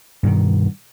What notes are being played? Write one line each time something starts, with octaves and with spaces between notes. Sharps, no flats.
G2 B2 D#3